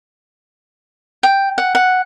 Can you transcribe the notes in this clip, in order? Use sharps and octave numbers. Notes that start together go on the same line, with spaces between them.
G5
F#5
F#5